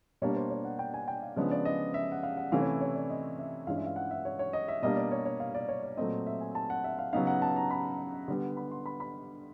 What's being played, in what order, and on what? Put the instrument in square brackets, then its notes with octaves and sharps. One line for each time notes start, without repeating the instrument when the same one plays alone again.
[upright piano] B2 G3 A#3 D4 C#5
C5
C#5
F#5
G5
G#5
G5
F5
C#3 F3 G#3 B3 D4 C#5
D5
D#5
E5
F#5
F5
F#5
C3 E3 A3 C#4 E4 F5
C#5
C#5
D5
D#5
E5
G2 E3 G#3 C#4 F4 F5
E5
F5
F#5
E5
C#5
C#5
D#5
E5
B2 G3 A#3 D4 D#5
D5
C#5
C#5
F5
D5
C#5
C#5
A#2 F#3 A3 C4 D#5
E5
G#5
A5
F#5
E5
F5
C#3 F#3 B3 D#4 F5
F#5
A5
A#5
B5
D3 G3 B3
B5
C6
B5
B5